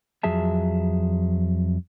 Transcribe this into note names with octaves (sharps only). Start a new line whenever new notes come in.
F2 F#3 G#4 E5 A5